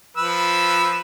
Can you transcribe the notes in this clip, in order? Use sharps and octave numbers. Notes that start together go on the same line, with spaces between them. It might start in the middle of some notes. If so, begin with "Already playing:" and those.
F3 B4 E6